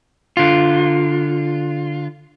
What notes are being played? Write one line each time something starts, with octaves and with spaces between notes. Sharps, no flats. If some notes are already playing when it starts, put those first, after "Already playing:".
D3 F4